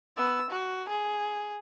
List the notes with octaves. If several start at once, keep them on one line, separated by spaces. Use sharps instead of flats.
B3 E6
F#4
G#4